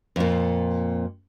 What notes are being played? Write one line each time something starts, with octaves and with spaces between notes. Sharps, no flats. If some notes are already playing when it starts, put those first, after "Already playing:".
F2 A#2